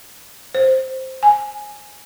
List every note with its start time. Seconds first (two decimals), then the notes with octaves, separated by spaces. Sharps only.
0.55 C5
1.23 G#5